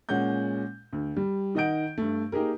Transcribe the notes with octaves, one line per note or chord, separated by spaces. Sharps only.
A#2 G#3 C#4 F#5 G6
D2
G3
D#3 D#4 D#5 F#5 G6 D7
G2 A3
A#3 D#4 G4 G#4 A#4